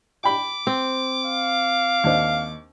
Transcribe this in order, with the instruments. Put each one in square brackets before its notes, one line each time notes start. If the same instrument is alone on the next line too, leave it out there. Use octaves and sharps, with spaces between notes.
[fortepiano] G5 B5 [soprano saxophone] D6
[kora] C4
[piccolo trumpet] F5
[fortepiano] D#2 D4 C5